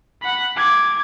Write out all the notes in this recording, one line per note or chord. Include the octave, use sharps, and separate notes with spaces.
F#5 B5
D6 G#6